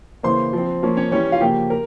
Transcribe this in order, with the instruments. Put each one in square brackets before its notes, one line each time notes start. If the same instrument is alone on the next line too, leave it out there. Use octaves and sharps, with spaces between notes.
[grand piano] C#3 E3 A#3 C5 C6
F3 C4
F3 A#3 C#4
C#4 C#5
E3 G3 C#4 C#5
F4 F5
C#3 F3 A#3 G4 G5
A#4